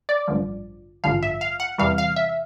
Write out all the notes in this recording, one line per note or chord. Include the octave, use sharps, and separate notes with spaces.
D5
A1 G2 D3 F3
A1 G2 D3 F3 F5
E5
F5
F#5
E2 C3 E3 G3 F5
F5
E5